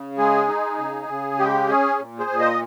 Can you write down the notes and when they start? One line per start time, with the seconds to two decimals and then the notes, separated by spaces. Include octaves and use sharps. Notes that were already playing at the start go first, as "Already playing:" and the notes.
Already playing: C#3
0.18 G#3 G#4
0.48 D#4
0.78 C#3
1.08 C#3
1.39 G#3 G4
1.68 C#4 G#4
1.99 A#2
2.19 G#4 C5
2.30 A#2
2.39 C5 D#5